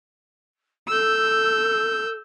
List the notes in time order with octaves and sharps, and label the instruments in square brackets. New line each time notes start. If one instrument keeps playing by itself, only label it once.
[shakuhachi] A4 [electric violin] E6 G6